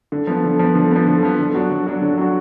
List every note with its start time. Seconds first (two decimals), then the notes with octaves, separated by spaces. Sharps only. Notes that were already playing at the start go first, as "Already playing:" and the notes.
0.12 D3
0.27 F3 B3
0.44 D3
0.59 F3 B3
0.75 D3
0.91 F3 B3
1.07 D3
1.23 F3 B3
1.39 D3
1.54 F#3 D4 F#4
1.70 D3
1.86 F#3 D4 F#4
2.02 D3
2.17 F#3 D4 F#4